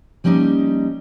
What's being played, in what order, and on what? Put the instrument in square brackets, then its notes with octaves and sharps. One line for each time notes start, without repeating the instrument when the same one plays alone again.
[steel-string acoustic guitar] F3 G3 A#3 C#4 D#4